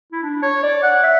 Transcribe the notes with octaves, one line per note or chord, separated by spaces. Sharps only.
E4
D4
C#5
D5
F#5
E5